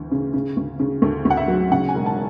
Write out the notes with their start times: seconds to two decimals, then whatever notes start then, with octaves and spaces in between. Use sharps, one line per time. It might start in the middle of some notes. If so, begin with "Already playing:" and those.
Already playing: D2 E3
0.12 C#3
0.34 C#3
0.57 D2
0.80 C#3
1.02 D2 A4
1.25 D2
1.30 F#5
1.37 E5
1.48 F#3
1.71 C#3 F#5
1.88 G#5
1.95 E1
2.06 A5